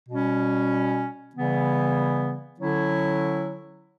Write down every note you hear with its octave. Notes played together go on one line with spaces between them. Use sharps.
B2 G3 C#4
C#3 E3 G3 B3
D3 F#3 C#4 E4